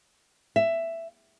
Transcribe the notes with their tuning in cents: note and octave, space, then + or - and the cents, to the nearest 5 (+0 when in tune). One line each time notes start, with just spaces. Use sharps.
E5 +10